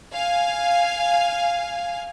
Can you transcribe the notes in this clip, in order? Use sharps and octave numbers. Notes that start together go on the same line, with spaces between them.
F5 G#5